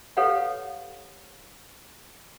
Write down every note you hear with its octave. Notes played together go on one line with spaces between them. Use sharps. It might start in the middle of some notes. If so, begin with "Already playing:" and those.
G4 A4 B4 C#5 F5 F#5